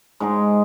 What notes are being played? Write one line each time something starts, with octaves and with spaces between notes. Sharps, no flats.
G#2 G#3 D#4 G#4